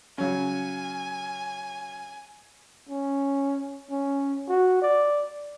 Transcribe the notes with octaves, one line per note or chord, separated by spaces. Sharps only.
C#3 F#3 C#4 G#5
C#4
C#4
F#4
D5